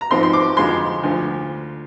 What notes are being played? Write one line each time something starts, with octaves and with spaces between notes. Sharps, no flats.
A#5
G#2 F3 C4 D#4 C6
C6
D6
F2 D3 F3 G#3 C6
D2 D3 F3